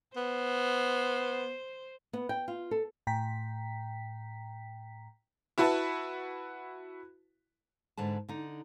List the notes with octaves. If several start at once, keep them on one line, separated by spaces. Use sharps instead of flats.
B3 C5
B3
G5
F4
A4
A2 G5 A#5 B6
E4 F#4 B4 E5 A5
G#2 D3 B4 A5
D3 D#4